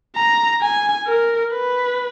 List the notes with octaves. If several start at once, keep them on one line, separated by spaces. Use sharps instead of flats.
A#5
G#5
A#4
B4